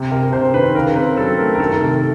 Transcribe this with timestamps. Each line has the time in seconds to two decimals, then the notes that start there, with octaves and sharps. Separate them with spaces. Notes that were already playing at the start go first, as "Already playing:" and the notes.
Already playing: C3
0.12 C3 A#4
0.33 C3 C5
0.54 D#3 B4
0.75 C#3 A#4
0.96 C4 B4
1.17 F#3 A4
1.38 A3 A#4
1.54 A#4
1.60 D#3 A4
1.81 C3 A4